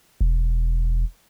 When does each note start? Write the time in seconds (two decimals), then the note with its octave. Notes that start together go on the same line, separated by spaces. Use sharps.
0.21 E1